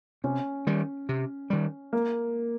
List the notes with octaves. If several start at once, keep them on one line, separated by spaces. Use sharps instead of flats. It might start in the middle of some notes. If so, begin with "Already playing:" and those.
C3 C#4
D#3 G3
C3
D#3 G3
A#3